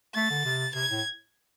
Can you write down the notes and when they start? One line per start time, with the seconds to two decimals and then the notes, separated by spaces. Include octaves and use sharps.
0.15 A3 A6
0.30 D3
0.45 C3
0.75 C3 G#6
0.91 A2